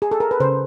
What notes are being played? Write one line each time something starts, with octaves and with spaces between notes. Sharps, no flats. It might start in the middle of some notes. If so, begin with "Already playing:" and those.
G#4
A4
A#4
B4
C#3 C5